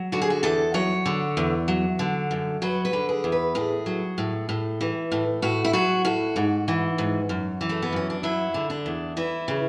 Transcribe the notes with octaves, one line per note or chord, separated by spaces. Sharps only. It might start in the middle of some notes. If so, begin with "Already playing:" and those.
Already playing: F#3
D3 F#4
G#4
F#4
E2 A4
F#3 C#5
D3
E2
F#3
D3
F#2
F#3 B4
B4
D3
G#4
E2
B4
A2 G#4
F#3
A2
A2
E3
A2
A2 F#4
E4
F#3 F#4
A2 F#4
G#2
E3
G#2
F#2
E3
A3
B3
F#2 C#4
D4
F#3 E4
D3
D4
E2
E3 E4
C#3